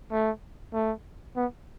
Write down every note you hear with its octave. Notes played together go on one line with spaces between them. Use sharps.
A3
A3
B3